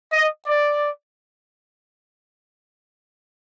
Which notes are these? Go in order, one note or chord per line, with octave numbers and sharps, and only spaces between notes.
D#5
D5